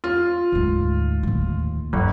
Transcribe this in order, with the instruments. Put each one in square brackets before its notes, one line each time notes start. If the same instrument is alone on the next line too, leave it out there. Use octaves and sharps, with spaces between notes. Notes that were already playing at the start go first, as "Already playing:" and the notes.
[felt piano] F4
[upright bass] D2 G#2
D#2 A2
[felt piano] G1 [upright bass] G2 D4